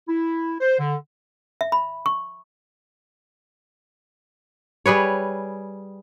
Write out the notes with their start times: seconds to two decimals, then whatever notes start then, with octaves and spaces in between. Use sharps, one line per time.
0.08 E4
0.60 C5
0.78 D3
1.61 E5
1.72 B5
2.06 C#6
4.86 G3 G#4 B4 C#5